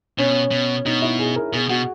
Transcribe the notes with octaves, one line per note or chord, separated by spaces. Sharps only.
B2 C#4
B2
B2 D#4
E4
G#4
A#4
B2 G#4
B2 F#4